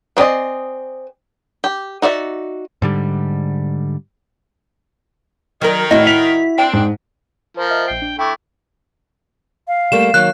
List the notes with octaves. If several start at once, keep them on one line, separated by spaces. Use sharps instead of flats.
B3 C4 G#4 D5 D#5
G4
D#4 F#4 D5 E5
G#2 D3 G3
D#3 F#3 A#4
A2 E4 F#4 D#5
B6 F7
C4 D4 G5
G#2
F3 A#4 C5
C5 D#5 E5
A#1 G5 C7
D4
A3 E4 G5 C#6 D6
F5
G3 A3 A#3 E7
D#3 F#3 A#3 F#6